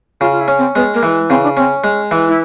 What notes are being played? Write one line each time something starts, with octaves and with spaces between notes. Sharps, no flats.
C#3 F4
F4
E4
C#4
C4
G#3 B3
A#3
E3
C#3 C4
D4
C4 C#4
G#3
E3
E4